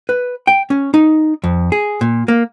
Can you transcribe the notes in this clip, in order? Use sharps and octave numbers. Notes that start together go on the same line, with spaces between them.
B4
G5
C#4
D#4
F2
G#4
A#2
A#3